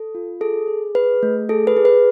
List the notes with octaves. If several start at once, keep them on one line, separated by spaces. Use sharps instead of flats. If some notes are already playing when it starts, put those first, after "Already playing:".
Already playing: A4
F4
G#4 A4
G#4
G#4 B4
A3
G#4 A4
B4
G#4
B4